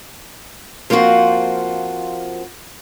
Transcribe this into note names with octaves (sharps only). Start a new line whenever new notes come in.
F3 A#3 C4 F4 F#4